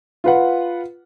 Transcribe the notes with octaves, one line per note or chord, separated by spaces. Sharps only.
F4 B4 F#5